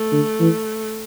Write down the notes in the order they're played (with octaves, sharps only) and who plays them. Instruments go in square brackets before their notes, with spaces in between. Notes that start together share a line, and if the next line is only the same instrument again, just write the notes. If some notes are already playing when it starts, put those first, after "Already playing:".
Already playing: [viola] A3
[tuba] D3
E3